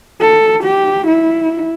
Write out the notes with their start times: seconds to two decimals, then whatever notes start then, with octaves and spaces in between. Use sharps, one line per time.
0.21 A4
0.64 G4
1.07 E4